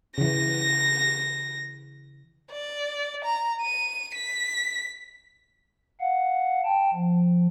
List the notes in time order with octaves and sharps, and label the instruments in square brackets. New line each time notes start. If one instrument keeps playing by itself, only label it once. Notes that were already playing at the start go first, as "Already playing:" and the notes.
[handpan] C#3 E3 [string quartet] A#6
[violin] D5
A#5
D#7
B6
[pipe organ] F5 F#5
G5 A5
F3